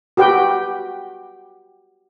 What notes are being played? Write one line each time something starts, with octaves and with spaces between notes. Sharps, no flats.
F#4 G4 B4 G5